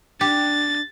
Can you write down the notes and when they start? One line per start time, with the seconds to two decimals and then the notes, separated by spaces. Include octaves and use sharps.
0.21 D4 G4 A6